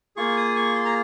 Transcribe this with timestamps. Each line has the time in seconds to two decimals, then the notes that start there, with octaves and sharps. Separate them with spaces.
0.16 A#3 F4 G#4 C#6
0.37 D#6
0.56 C#6
0.75 C6
0.85 A#5